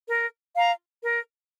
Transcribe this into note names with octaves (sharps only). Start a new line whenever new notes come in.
A#4
F5 A#5
A#4